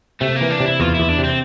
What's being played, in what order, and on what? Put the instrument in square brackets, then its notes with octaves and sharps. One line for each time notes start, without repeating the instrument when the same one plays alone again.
[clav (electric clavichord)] C3 [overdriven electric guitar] A3
[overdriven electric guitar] A#3
[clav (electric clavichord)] E3
[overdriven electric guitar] D4
[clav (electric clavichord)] C3
[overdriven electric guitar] E4
[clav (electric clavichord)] E2 [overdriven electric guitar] F4
[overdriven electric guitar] E4
[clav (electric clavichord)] E2
[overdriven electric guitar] D4
[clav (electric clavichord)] C3
[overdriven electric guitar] C4